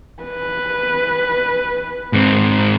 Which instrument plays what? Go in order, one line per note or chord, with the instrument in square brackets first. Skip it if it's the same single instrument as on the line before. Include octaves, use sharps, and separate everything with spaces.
[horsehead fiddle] B4
[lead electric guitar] G#2 C4